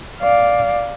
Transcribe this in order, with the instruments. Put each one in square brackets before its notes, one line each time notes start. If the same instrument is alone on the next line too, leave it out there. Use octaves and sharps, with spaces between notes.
[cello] D5 F5